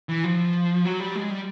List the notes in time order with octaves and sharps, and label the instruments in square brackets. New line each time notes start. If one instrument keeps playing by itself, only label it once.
[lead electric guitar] E3
F3
F#3
G3
G#3
G3